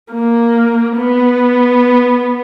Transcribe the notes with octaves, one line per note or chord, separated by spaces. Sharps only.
A#3
B3